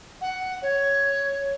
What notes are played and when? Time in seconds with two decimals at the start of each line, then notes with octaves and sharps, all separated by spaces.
0.21 F#5
0.62 C#5